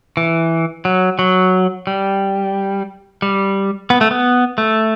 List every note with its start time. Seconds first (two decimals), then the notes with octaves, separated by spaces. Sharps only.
0.17 E3
0.85 F#3
1.19 F#3
1.87 G3
3.22 G3
3.90 B3
4.01 A3
4.11 B3
4.58 A3